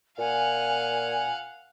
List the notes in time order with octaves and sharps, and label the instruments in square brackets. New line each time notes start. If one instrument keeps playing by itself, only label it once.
[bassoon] A#2 [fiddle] F5 F#5 [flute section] G#5